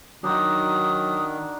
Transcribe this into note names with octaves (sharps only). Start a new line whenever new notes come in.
D#3 F#3 D4 D#4 F#4 D#6